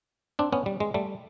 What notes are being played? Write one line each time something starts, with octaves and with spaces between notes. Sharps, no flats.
C4 D4
B3 C#4
G3
G#3
G3 A3